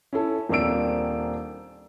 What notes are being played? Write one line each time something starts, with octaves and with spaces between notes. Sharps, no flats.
C#4 E4 A4
D#1 A#3 C4 D4 E6 D7